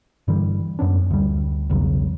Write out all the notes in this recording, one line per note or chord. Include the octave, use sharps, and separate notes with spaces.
G2 D3 E3 G3
F#2 B3 C#4 D4
D2 G3
B1 E2 C#3 F#3